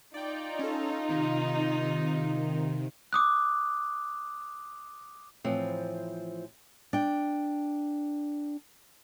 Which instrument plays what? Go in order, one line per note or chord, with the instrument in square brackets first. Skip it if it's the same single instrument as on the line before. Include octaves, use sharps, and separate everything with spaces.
[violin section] D#4 F4 [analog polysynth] D5 G5
[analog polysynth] C#4 A4
C3 D#3
[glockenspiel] D6 D#6 F#6
[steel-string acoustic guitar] A2 E3 F3 C4
D4 G5